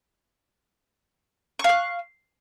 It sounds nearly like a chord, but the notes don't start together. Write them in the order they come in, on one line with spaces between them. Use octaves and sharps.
C#6 F5 F#6